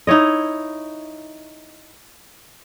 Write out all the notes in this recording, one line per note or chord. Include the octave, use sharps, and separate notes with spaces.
D#4 E4 C#5 D#5